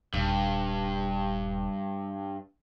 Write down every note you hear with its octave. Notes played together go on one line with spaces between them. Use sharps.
D#1 G2